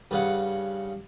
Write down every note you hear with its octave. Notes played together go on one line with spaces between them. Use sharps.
G2 C#3 F#5